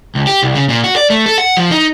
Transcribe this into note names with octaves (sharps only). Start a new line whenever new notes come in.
C#2
G4
C2
C#3
A#2
F#4
D5
A3
A4
F#5
F3
D#4